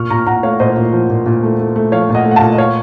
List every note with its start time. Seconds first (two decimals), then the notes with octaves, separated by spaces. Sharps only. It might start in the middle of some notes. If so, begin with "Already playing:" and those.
Already playing: A#2 C#6 F6
0.10 A#2 A#5 C#6
0.27 A#2 F#5 A#5
0.43 A3 C#5 F5
0.60 A#2 C5 D#5
0.76 A#2
0.93 F3
1.10 A#2
1.26 A#2
1.43 A3
1.59 A3
1.76 A3
1.92 F3 C#5 F5
2.09 A#2
2.15 D#5 F#5
2.25 A3
2.31 F#5
2.36 F5 A5
2.41 A#2
2.52 D#5
2.58 C#5 F5